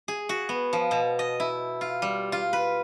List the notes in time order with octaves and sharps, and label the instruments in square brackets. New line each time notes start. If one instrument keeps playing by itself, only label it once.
[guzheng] G#4
F#4
B3
F3
B2
D#5
E4
F4
G3
F4
B4